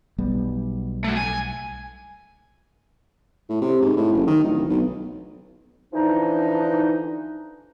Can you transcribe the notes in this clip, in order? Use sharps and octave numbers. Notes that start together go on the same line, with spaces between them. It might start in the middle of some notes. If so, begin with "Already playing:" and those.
B1 G3 B3
A3 F#4
G#5
A2
C3
G#2
A2
F#1
D#3
D1
B1
D3 E3 F3 D4 D#4